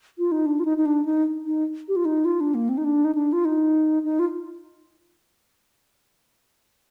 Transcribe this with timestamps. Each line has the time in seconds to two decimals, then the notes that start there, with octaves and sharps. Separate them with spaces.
0.19 F4
0.32 D#4
0.46 D4
0.60 F4
0.65 D#4
0.78 D#4
0.86 D4
1.05 D#4
1.46 D#4
1.88 G4
1.96 F4
2.05 D#4
2.25 F4
2.40 D4
2.55 A#3
2.69 C4
2.77 D#4
2.84 D4
3.04 D#4
3.15 D4
3.33 F4
3.45 D#4
4.04 D#4
4.19 F4